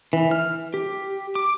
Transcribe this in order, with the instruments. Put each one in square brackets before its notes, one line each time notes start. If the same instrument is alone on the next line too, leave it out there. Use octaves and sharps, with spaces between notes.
[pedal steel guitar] E3
F6
G4
D6